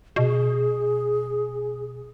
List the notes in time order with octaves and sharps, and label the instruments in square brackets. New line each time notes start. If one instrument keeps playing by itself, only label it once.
[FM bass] B2 [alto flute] G#4